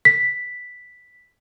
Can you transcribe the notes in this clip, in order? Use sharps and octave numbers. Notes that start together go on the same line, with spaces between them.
B6